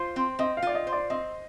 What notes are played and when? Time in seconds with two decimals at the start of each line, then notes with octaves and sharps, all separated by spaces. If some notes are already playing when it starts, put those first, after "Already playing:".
Already playing: F4 C5
0.16 C4
0.39 C4 D#5
0.57 F5
0.62 F4 D5
0.75 D#5
0.87 C5
0.92 D5
1.10 C4 D#5